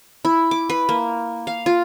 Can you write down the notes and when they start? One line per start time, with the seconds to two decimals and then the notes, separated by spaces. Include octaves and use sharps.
0.25 E4
0.51 D6
0.70 B4
0.89 A#3
1.47 F5
1.66 F4